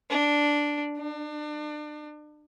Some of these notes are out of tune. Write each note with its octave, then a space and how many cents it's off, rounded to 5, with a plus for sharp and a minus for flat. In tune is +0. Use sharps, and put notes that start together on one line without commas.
D4 -5
D4 +35